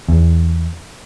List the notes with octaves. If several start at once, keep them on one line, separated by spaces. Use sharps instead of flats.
E2